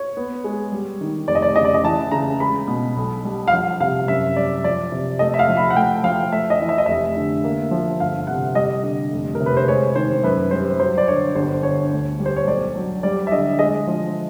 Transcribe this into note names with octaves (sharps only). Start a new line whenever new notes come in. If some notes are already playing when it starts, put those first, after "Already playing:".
Already playing: C#5
B3
G#3
G3
D#3
F1 D5
D#5
D5
C#3 D#5
D5
D#5
E3 A5
C#3 A#5
G#3 B5
B2
B1
G3
F5
F3 F#5
C3 F5
F#2 E5
G3 D5
F3 D5
C3
A3 D#5
E5
F5
F3
B5
F#5
A3 G5
F3 F5
A3 E5
D#5
E3
E5
D#5
F1 E5
D3
A#3
F3
G1 F5
C3 F#5
G3 D#5
D3
F1
A#4
C3
B4
C5
G#3 C#5
D#3 C5
F#2 B4
G3 C5
F#3 C5
D5
D3 C#5
G1 C5
D3 C#5
D2
G3
C5
C#5
B1 D5
F#3
G3 D5
E5
D3 D#5
G#3 D#5
F3